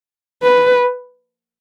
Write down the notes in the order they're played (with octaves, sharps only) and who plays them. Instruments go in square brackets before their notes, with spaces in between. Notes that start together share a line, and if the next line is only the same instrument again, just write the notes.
[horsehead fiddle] B4